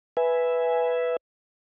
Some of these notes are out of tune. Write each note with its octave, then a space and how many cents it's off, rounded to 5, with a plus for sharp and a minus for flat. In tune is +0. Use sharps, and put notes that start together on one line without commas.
B4 +0 E5 +0 G#5 +0